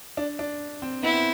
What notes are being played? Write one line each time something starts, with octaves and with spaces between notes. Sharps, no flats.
D4
D4
C4
B3 E4
C4